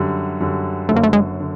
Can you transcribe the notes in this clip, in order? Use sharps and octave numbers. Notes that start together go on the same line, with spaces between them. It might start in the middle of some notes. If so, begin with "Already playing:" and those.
Already playing: F#2 D3 G3
F#2 D3 G3
F#1 F#2 D3 A3
A#3
A3
G#3
D3